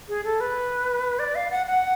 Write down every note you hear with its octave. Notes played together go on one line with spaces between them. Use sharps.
G#4
A4
B4
D5
F5
F#5
F#5